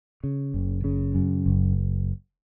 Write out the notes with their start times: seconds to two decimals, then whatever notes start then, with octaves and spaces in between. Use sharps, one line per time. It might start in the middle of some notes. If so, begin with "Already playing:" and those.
0.24 C#3
0.54 F#1
0.84 C#3
1.15 F#2
1.46 F#1